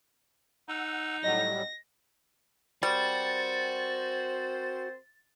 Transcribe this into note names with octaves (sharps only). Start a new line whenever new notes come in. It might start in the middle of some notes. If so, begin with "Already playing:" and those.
D#4 F#5 E6
A2 F#3 G3 D#5 F#5 A#6
G3 C4 F#4 A#4 C5 A6